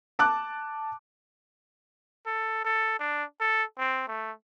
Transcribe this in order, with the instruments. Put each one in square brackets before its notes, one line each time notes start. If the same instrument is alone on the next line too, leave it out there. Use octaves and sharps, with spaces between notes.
[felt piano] A5 D6 F#6
[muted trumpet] A4
A4
D4
A4
C4
A3